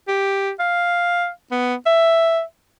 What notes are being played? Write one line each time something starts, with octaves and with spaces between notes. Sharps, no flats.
G4
F5
B3
E5